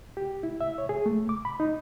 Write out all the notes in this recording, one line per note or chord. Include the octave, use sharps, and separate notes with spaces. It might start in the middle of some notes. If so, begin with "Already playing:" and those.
G4
E4
E5
C#5
G#4
A3
D6
B5
D#4